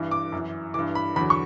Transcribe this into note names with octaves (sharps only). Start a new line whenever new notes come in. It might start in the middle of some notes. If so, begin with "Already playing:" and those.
Already playing: G2 E3
D6
F#2 E3
G2 E3 D6
B5
E2 D3 F#3 B5
C#6